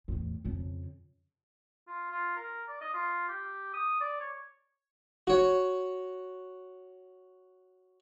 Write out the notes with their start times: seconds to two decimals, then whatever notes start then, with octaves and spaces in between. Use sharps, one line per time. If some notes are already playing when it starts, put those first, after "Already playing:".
0.08 E2 A2
0.45 F2 C#3
1.88 F4
2.11 F4
2.36 A#4
2.68 D5
2.81 D#5
2.94 F4
3.28 G4
3.74 D#6
4.01 D5
4.20 C#5
5.27 F#4 C#5